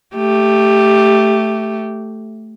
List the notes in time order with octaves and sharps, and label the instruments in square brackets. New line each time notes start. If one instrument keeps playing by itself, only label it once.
[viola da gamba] A3 G4